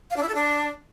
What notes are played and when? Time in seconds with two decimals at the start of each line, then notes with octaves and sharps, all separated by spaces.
0.10 F5
0.16 D4
0.22 E4
0.28 A4
0.35 D4